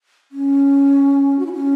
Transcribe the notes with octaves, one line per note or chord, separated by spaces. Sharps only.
C#4
F#4
E4
C#4